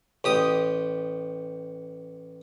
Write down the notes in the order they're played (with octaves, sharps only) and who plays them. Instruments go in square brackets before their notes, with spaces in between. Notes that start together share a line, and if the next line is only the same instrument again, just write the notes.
[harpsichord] A1 G4 D#6